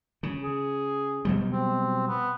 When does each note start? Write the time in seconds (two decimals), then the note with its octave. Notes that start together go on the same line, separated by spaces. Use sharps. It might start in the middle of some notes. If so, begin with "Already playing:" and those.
0.23 C#3
0.43 G#4
1.25 B2 F#3 G3
1.52 C4
2.07 B3